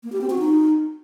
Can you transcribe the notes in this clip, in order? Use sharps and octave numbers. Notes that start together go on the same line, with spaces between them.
A#3
G4
C4
F#4
D#4